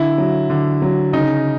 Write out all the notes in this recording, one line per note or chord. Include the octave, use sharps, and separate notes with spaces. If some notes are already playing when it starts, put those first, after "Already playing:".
Already playing: D3 E4
F#3
D3
F#3
C#3 D#4